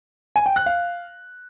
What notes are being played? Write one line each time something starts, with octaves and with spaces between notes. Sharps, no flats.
G#5
G5
F#6
F5